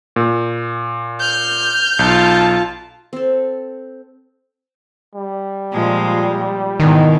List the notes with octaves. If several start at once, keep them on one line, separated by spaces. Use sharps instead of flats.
A#2
F6 G6
B1 F4 A5
C4 A4
G3
A#2 F3 G#3
G#2 B2 D#3 E3